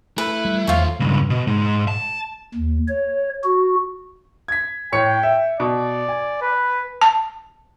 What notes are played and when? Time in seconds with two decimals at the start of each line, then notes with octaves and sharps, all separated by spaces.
0.18 A3 E4 B4
0.45 G3
0.67 E2 D#3 F3 F4 C5 C#5
1.00 C#2 G2
1.30 B2
1.47 G#2
1.88 A5
2.54 D#2
2.88 C#5
3.44 F#4
4.48 G#6 B6
4.92 A2 C#5 G5 C#7
5.23 E5
5.60 B2 D5
6.09 G#5
6.42 B4
7.01 A5